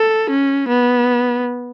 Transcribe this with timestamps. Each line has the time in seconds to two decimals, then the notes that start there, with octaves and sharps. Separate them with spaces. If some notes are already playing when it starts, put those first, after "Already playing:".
Already playing: A4
0.30 C#4
0.69 B3